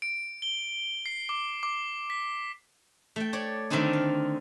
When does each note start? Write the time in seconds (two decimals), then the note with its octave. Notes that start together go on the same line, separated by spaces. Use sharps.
0.02 D7
0.42 G7
1.06 C7
1.29 D6
1.63 D6
2.10 B6
3.16 A3 G5
3.33 C#5 D5
3.70 D3 D#3 A3 C4 D4 D#4
3.93 F5